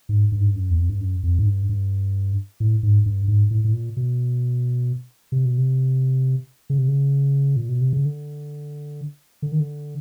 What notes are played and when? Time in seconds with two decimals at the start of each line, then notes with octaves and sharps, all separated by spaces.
0.09 G#2
0.32 G2
0.40 G#2
0.47 G2
0.55 F#2
0.70 E2
0.78 F2
0.90 G2
1.00 F#2
1.23 F2
1.39 G#2
1.46 G2
1.69 G2
2.60 A2
2.83 G#2
3.06 G2
3.28 G#2
3.51 A2
3.64 A2
3.74 A#2
3.97 B2
5.32 C3
5.45 B2
5.58 C3
6.70 C#3
6.78 C3
6.88 C#3
7.56 A#2
7.69 B2
7.81 C3
7.93 C#3
8.05 D3
9.42 D3
9.52 D#3
9.60 D3